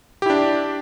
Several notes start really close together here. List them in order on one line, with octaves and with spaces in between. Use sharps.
G4 E4 D4